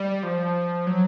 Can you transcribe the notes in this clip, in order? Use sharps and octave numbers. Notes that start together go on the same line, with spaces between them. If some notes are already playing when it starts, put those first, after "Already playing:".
Already playing: G3
F3
F#3